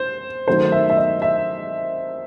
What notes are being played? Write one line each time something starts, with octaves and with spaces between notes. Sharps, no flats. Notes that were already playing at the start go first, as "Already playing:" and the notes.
Already playing: C5
D#3 F#3 A3 C5
E5
E5
D#5
E5